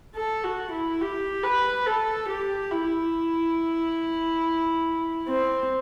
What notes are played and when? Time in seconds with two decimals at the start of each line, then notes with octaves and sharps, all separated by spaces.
0.15 A4
0.44 F#4
0.72 E4
1.01 G4
1.43 B4
1.86 A4
2.29 G4
2.72 E4
5.28 C4